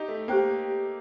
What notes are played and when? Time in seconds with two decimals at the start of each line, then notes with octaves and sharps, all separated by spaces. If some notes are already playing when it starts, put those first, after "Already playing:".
Already playing: D#4 G4
0.09 A3
0.28 A#3 G4 C5 G5 A#5